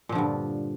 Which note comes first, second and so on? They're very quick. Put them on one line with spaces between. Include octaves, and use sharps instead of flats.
A#2 F3 D3 G2